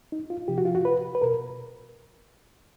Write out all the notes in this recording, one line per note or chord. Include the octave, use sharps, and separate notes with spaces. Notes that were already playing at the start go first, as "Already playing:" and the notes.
D#4
F4
C3 F3 G4
F#4
F4
F#4
B4
B4
B2 A#4